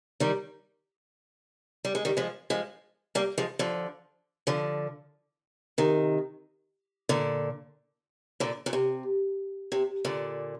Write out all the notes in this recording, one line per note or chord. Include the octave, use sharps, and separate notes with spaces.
D#3 G3
G3
G#3
D#3 G3
F3 G#3
F3 G#3
G3 A#3
F3 G#3
D3 F3
D3 F3
C3 D#3
A#2 D3
A#2 D3
A#2
C3
C3
A#2 D3